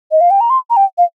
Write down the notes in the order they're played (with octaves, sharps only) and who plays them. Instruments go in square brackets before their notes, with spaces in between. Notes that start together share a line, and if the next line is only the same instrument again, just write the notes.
[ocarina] D#5
F5
G5
A#5
C6
A#5
G5
F5